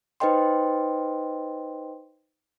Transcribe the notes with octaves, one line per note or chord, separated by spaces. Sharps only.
D#4 B4 C5 D#5 G5 C6